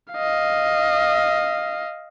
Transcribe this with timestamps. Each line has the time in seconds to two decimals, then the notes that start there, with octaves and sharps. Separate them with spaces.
0.13 D#5 F5